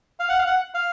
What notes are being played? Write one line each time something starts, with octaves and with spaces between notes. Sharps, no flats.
F5
F#5
F5
F#5
F5